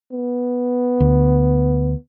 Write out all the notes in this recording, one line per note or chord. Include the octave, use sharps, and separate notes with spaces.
B3
D2